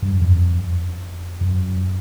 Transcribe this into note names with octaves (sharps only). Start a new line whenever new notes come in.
G2
F#2
F2
F#2